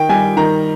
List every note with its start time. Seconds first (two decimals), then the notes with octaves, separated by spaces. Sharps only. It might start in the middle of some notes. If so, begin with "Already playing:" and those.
Already playing: D#3 G5
0.09 G3 G#5
0.37 D#3 A#5